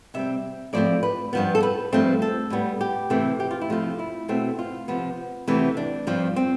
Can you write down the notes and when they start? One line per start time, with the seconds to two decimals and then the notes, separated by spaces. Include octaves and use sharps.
0.14 C3 G3 C4 E5
0.73 A2 F3 A3 C4 D5
1.03 B4
1.33 G2 F3 B3
1.55 A4
1.63 B4
1.93 G2 F3 A3 C4
2.22 A4
2.50 A2 G3 B3
2.81 G4
3.10 C3 E3 A3 C4
3.40 G4
3.51 F4
3.61 E4
3.70 C3 F3 A3 F4
3.99 E4
4.29 B2 A3 C4
4.59 F4
4.88 C3 F3 B3
5.47 E2 C3 E3 A3 C4
5.77 D4
6.07 G2 F3 C4
6.36 C4